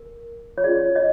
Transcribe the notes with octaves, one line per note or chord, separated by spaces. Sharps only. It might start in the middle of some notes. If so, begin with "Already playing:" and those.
Already playing: A#4
C#5
C#4 F4 G#4 D5
C#5 D#5